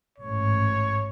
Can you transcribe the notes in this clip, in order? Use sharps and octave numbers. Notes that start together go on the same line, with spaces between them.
A1 G#2 C#5